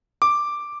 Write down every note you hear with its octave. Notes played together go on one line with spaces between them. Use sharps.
D6